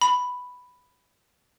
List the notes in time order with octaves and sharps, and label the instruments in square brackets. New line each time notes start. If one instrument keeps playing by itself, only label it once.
[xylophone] B5